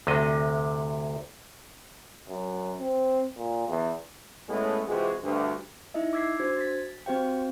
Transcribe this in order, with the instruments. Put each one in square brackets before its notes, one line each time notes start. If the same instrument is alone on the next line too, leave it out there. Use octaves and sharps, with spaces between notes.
[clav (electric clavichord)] D2 C3 D#5
[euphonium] F#2
C4
A#2
E2
[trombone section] A2 G#3 A3 B3 C#4
C3 E3 G#3 F4 F#4 G#4
D2 G2
[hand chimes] D#4 E4 D#5 E5
D6 E6 G#6 B6 C7
D4 F#4 C5 G#6
A6 B6
C4 F#4 G4 C5 F5 G5